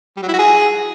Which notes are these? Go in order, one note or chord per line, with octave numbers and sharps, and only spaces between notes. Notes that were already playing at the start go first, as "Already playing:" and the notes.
G3
F#3
E4
F#4
G#4